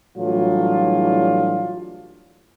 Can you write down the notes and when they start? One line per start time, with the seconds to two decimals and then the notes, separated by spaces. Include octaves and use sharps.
0.17 A2 E3 F#3 G3 D4 F4